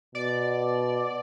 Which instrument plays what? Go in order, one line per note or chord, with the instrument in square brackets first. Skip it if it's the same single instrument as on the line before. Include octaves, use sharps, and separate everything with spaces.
[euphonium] B2 [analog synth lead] D5